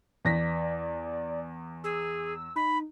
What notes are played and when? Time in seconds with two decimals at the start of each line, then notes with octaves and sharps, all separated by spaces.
0.25 E2 D5 A#6 B6
1.84 G#4 E6
2.56 D#4 B5